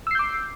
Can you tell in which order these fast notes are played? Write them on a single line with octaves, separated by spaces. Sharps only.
E6 C7 G6 D6